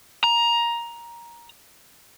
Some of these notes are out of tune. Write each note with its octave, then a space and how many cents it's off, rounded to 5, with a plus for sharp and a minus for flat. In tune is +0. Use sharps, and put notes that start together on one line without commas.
A#5 +15